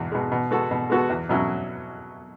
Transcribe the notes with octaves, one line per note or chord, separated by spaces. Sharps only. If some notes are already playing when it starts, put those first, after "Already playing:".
Already playing: E2 B2 G#3
B2 G#3
B2
G#3 B3 F#4 A4
B2
G#3 B3 F#4 A4
E2
B2 F#3 C#4 E4